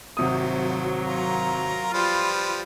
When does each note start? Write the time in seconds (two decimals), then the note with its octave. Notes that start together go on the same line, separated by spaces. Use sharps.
0.17 G#1 C3 F3 F#3 D#6
1.06 F4 A#4 A#5
1.94 F3 G3 F4 B4